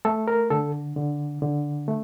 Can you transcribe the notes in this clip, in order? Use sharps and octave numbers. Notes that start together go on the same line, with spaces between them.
A3 A4
A#4
D3 A4
D3
D3
A3